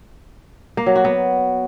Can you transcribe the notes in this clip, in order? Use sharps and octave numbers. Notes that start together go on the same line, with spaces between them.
A#3
F#3
F#4
B3